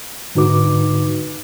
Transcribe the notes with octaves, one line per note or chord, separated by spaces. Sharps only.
G#2 D3 D#4 F#4 B4 D6